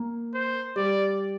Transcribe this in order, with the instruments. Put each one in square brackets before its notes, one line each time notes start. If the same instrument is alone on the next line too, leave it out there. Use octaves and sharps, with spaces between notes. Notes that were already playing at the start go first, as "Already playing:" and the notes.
Already playing: [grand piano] A#3
[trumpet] C5
[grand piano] G3 [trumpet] D5